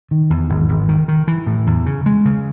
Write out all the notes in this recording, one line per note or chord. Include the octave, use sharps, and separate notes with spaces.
D#3
E2
G#1
G#1
D#3
D#3
E3
A2
E2
C#3
G#3
C#3